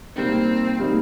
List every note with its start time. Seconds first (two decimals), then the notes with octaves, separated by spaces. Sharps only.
0.15 C3 G3 A#3 C4 D#4
0.78 C3 G3 A#3 D#4